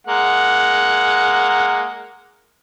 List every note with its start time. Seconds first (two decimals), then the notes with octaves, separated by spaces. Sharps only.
0.07 G#3 A#3 F#5